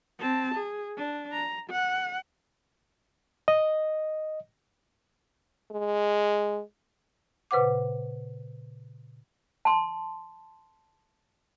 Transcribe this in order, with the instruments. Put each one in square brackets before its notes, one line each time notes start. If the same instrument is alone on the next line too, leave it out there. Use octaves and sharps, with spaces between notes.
[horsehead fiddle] C4 A5
G#4
D4
A#5
F#5
[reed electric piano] D#5
[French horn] G#3
[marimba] A#2 C#3 B4 C5 F#5 D6
[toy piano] A5 C6